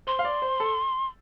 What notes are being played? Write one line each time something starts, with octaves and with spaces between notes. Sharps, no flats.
C5 C6
F5
D5
C5
A4